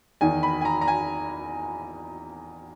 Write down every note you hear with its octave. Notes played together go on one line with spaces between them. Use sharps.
E2 D#3 G#5
B5
G#5
A#5
A#5
G#5